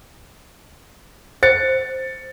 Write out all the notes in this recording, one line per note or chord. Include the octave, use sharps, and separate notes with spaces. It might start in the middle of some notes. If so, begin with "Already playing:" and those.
C5 A6 C#7